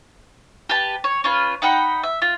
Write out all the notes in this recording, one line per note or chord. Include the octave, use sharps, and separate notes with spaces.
G4 B4 A5
C#5
C#4 F4 B4
D#4 F#5 G5 B5
E5
F4